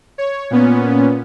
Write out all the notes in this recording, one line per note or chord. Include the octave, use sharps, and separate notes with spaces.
C#5
A#2 B3 C#4